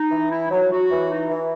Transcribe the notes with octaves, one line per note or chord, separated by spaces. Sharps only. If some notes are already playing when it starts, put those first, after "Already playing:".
Already playing: D#4
E3
E4
F#3
F#4
E3
D#4
E3